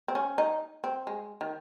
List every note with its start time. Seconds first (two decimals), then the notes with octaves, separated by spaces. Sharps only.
0.08 C4
0.15 C#4
0.38 D#4
0.84 C4
1.07 G#3
1.41 D#3